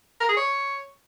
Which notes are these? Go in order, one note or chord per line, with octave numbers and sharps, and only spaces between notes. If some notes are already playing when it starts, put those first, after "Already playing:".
A#4
G#4
C#5